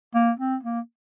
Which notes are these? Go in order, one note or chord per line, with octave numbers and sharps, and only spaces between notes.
A#3
C4
A#3